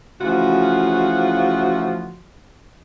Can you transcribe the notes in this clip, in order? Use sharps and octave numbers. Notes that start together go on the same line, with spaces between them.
C#3 E3 F3 A3 F4 F#4